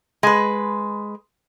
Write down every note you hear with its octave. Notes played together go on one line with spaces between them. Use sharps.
G#3 B4